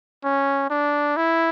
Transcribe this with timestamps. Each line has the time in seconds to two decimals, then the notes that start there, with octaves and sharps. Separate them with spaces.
0.24 C#4
0.70 D4
1.17 E4